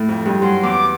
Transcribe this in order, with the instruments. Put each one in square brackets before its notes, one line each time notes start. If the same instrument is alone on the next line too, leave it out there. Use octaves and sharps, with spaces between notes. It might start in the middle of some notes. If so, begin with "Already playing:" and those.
Already playing: [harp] A2
F2
G2
[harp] F#2 [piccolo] C6
[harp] E2 [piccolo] D6